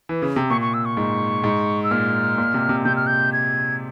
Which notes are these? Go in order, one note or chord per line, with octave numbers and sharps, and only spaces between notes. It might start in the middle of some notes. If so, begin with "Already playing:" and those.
E3
C#3
C3
A#2 C#6
C#6
E6
C#6
G#2
G#2
E6
A#2 F6
A#2
C3
C3
C3 G6
F6
G6
G#6